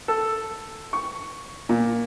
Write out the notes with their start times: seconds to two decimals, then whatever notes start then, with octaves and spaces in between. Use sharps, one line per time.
0.08 A4
0.93 C#6
1.69 A#2